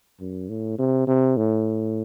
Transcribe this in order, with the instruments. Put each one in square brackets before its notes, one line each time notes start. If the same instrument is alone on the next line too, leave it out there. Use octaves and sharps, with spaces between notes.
[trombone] F#2
A2
C3
C3
A2